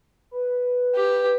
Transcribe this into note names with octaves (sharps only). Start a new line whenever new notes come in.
B4
G4